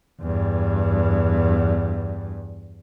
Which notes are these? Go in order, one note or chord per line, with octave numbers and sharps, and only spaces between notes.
E2 G2